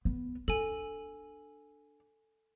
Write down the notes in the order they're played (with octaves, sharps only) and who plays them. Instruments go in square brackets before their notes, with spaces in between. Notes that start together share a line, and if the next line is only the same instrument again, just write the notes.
[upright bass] B3
[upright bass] D4 [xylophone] A4 G#5